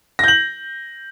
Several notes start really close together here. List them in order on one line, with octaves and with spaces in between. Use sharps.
A#6 G6 F#7